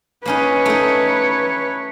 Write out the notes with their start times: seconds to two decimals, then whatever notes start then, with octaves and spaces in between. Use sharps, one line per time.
0.26 A#3 C#4 D#4 B4 C#5
0.65 A3 D#4